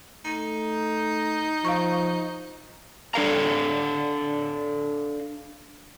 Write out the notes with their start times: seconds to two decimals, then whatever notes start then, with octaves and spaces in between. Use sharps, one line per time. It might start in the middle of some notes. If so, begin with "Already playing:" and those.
0.25 A3 D#4
1.65 F3 F5 A#5 C#6
3.14 D4 A4 F5 A#5